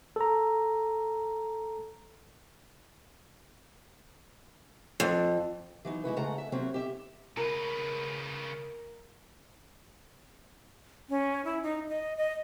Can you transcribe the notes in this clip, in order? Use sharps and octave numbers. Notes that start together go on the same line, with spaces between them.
A4 A#5
F2
E3 F#3 D#4
G#3 E4 F#4 B4
C#3 G#3 A3 F#5 A#5
E5
C3 F#3 A#3 C4 C#5 E5
G4 E5
C#3 A#4 B4
C#4
E4
D#4
D#5
D#5